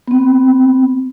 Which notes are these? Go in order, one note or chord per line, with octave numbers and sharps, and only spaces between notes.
B3 C4